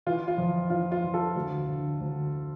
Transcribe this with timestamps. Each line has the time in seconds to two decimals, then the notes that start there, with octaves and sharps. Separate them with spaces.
0.06 E3 F4
0.28 F4
0.38 F2
0.70 E3 F4
0.92 F4
1.04 E3
1.14 F4 A4
1.36 D2
1.68 D3
2.01 D2